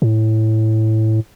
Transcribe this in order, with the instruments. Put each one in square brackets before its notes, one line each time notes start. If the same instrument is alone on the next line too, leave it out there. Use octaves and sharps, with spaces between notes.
[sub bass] A2